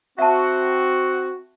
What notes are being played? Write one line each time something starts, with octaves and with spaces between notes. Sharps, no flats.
C4 F#4 E5 A5